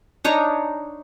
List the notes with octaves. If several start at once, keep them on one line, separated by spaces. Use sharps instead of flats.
D4 D#4 C#5 A#5